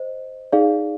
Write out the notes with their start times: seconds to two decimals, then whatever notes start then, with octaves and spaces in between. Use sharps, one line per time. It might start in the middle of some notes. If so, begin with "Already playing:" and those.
Already playing: C5 D#5
0.52 D#4 G#4 D5 F5